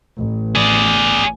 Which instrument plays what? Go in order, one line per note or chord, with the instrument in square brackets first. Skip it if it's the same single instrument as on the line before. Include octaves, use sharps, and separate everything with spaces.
[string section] A1
[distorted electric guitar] G#4 D5